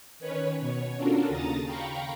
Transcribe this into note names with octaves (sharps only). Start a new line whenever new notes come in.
D#3 C#4 B4 C#5
B2 C#5
C#4 D4 F4 F#4 A4 A#4
D#2 C#3 A5 A#5 D#6 A6
F5 G5 A#5 B5 C#6